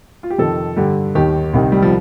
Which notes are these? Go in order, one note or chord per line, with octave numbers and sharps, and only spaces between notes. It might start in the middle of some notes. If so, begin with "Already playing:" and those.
F4
G4
F2 C3 D#3 A4
G2 D3 G4
D#2 D#3 G4
C2 C3 D#3
G3
F3